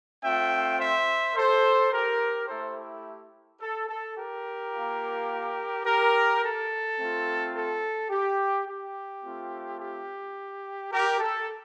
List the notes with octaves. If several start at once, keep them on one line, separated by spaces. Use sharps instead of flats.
A3 C4 F4 E5 G5
C5 E5
A4 C5
G4 A#4
A3 E4 G4 A4 C5
A4
A4
G4 A#4
A#3 F4
G4 A#4
A4
A3 C4 F4
A4
G4
G4
A3 C4 F4
G4
G4 A#4
A4